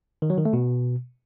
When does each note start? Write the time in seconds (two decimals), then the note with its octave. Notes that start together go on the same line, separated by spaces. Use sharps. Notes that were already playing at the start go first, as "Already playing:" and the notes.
0.22 D#3
0.30 F#3
0.38 D#3
0.45 A3
0.53 B2